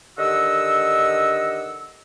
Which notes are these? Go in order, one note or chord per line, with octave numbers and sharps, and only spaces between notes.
D3 D#3 G4 D#5 F#5 E6